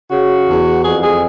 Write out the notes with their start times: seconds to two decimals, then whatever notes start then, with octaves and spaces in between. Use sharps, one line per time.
0.10 C#3 F#4
0.47 E2
0.84 F2 G#4
1.02 G#4